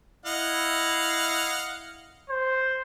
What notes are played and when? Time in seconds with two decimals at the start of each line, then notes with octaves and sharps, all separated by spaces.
0.26 E4 D#5 F5 F#5
2.30 C5